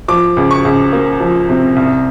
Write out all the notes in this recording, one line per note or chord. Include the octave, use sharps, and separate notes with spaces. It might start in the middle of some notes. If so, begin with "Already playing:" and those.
F3 D6
C#2
C#6
C#2
A#3
F3
C3
C2